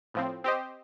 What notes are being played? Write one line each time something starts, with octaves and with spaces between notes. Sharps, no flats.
A2 F3 C4
C4 G4 C5 D#5